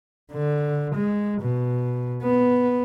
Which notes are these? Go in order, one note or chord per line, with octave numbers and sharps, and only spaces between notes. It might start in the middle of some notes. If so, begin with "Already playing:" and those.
D3
G#3
B2
B3